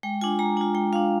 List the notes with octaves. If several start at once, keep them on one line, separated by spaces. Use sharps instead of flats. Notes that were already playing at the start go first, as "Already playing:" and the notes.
G#3 G5
D4 F4 G#5
G#3 A#5
D4 F4 G#5
G#3 G5
D4 F4 F5